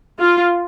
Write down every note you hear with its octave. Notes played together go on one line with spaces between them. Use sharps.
F4